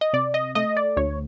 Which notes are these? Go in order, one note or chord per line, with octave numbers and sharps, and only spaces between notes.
D#5
C3 D5
D#5
A3 D#5
D5
D2 C#5